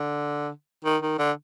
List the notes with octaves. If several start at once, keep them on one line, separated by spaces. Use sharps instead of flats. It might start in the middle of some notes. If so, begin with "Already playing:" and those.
Already playing: D3
D#3
D#3
D3